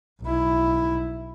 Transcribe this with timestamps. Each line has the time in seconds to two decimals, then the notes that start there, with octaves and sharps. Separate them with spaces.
0.22 B1 E4